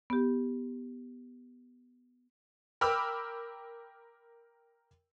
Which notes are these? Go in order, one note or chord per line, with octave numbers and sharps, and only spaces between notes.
B3 G4
A#4 G5 B5 D6 E6 F6